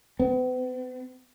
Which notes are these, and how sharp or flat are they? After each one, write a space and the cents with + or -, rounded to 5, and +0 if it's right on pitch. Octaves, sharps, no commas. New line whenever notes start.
B3 +45